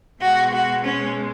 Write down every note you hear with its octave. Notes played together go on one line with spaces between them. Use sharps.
B2 G#3 F#4
F#4
C#4